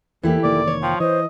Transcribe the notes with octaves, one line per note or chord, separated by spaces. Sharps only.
E2 E3 A#3 E4 G4 A4
F1 D#3 A#3 D5
C#5
F3 G5
E3 C5 D#5